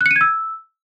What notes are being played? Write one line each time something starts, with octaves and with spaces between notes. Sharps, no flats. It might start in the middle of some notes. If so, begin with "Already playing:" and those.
F#6
C#7
D#7
G#6
E6